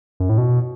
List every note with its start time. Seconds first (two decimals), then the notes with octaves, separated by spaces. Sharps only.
0.20 F#2
0.29 A2
0.38 B2